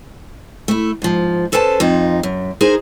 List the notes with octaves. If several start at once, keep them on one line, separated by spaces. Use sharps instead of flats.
A3 E4
G#2 F3
C#4 A4 B4 C5 G#5 A5
F2 D#4 F4
F#2
D#4 G#4 A#4 C5